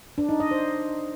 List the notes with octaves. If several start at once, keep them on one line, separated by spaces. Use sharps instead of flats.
D4
D#4
D#5
C5